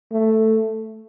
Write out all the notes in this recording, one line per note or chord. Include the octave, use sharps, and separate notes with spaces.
A3